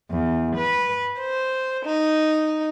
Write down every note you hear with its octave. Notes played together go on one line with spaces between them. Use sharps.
E2
B4
C5
D#4